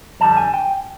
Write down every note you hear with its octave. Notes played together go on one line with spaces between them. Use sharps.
F2 D3 G3 A5
G#5
G5